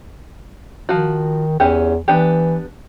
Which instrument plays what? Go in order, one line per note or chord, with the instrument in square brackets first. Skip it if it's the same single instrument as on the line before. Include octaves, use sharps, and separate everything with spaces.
[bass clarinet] D#3 [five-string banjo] F3 F#4
[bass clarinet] E2 [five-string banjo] E3 C#4 G4
[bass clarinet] E3 [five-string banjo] B3 D4 G4